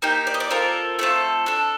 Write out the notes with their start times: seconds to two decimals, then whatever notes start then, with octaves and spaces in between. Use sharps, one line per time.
0.02 A#3 D#4 G4
0.27 D5
0.34 D#5
0.40 D5
0.51 C4 F4 A4 A#4
0.99 A3 C4 F4 A4
1.46 D4 A4